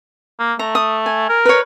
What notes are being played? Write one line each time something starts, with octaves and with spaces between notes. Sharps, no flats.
A#3
A3 A#5
D#6
G#5
A#4
B4 C#5